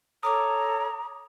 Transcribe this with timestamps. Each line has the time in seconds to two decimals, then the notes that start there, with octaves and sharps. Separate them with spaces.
0.23 A4 C#5 A#5 D6 D#6